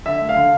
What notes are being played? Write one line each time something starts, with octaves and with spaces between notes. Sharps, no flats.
D3 E5
A3
F5
D3